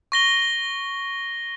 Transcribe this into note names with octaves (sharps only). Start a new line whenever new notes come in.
C#6 A#6 G7